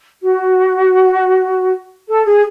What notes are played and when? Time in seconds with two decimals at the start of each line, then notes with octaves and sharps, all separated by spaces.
0.21 F#4
2.08 A4
2.25 G#4